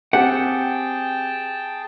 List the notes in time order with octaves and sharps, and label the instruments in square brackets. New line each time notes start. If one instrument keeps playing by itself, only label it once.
[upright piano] C4 G4 [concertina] G#4 G5 A5 [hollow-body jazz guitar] F#5